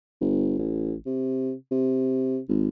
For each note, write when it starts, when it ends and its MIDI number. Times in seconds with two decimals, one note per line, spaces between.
0.21 0.58 31
0.59 0.95 33
1.06 1.53 48
1.71 2.39 48
2.49 2.68 32